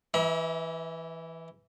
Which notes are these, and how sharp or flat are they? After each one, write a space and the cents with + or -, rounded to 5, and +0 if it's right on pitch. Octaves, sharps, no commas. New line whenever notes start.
E3 +0 E5 -45 A#5 +45